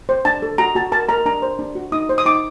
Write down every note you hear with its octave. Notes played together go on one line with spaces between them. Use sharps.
C5
D4 A5
A4
F#4 A#5
F#4 A5
A#4 A5
A#4 A#5
D4 A#5
C5
D4
F#4
D#4 D#6
C5
D#6
D#4 D6